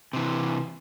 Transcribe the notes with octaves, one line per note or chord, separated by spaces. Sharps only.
C3 E3